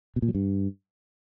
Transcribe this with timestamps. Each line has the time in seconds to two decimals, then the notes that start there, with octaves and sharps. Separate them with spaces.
0.16 B2
0.22 A#2
0.28 F#3
0.35 G2